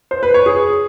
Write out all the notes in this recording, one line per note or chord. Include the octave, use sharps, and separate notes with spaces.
C5
B4
C#5
G#4